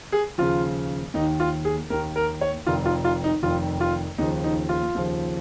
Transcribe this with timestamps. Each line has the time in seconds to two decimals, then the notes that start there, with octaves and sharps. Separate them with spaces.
0.12 G#4
0.38 D#2 C#3 F3 F4
1.14 D#2 D#3 D#4
1.40 F4
1.65 G#4
1.90 D#2 D#3 A#4
2.16 A#4
2.41 C#5
2.66 F1 F2 D#3 F4
2.86 F4
3.04 F4
3.24 D#4
3.43 F1 F2 D#3 F4
3.80 F4
4.18 D#2 C#3 F3 D#4
4.44 D#4
4.69 F4
4.95 D#2 C#3 F3